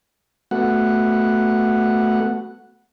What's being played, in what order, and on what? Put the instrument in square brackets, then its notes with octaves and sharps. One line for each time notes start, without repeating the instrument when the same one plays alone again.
[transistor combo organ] A3 B3 F#4 F#5